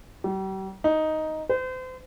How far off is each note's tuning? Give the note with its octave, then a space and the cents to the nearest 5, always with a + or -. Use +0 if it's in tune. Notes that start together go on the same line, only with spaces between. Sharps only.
G3 -40
D#4 +5
C5 -35